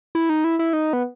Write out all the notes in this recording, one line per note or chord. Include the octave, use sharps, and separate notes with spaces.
E4
D#4
E4
E4
D#4
B3